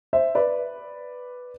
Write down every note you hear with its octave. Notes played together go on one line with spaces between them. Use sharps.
C5 E5
B4 D5